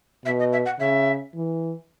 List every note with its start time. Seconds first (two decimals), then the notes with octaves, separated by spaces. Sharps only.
0.25 B2 E5
0.39 D#5
0.52 E5
0.65 F#5
0.79 C#3 E5
1.34 E3